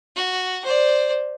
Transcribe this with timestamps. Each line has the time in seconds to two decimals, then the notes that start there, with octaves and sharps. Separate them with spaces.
0.16 F#4
0.65 C5 D5